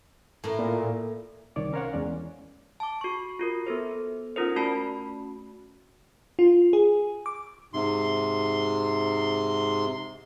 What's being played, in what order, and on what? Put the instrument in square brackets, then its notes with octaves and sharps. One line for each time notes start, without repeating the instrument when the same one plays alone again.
[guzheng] A2 A#4
[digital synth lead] A#2
[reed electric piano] C2 D#3 C#5 D5 D6
C#4 A#4 C5 C#5 F5 F#5
E2 G#3 C#4 D5
[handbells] A5 D6
F#4 C#6
F4 F#4 A#4
B3 A4 C5
C#4 D#4 F4 A#4 C5
A3 C#4 F#4 A5 B5
[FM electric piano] F4
G#4
D6
[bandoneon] G#2 C3 C6